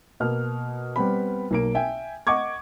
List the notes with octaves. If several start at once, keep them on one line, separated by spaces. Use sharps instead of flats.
B2 A#3 F6
G3 B3 C4 B5
B1 A#3 D7
E5 G5 G#5
D#5 F#5 C#6 D6 G#6